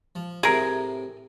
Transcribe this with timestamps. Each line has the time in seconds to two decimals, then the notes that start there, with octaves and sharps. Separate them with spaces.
0.15 F3
0.43 A2 C3 G#4 A#4